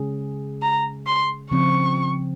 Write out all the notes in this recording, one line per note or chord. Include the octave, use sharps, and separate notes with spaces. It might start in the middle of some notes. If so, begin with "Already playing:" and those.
Already playing: C#3 G#3 C#4 G#4
A#5
C6
C#3 F3 C4 C#6